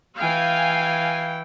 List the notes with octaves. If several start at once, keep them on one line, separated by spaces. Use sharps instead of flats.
E3 F5 G5 G#5